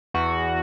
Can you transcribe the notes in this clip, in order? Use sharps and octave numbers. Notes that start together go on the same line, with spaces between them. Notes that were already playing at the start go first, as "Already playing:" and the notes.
E2 F#4